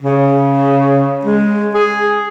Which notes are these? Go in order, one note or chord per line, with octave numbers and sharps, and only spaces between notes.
C#3
G#3
G#4